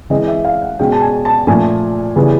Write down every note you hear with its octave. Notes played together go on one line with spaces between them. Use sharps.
E3 G#3 C4 D#5
E5
F5
F#5
B2 G#3 C#4 G5
A5
G#5
A5
A#2 F3 A3 G#5
C#3 E3 G3 B3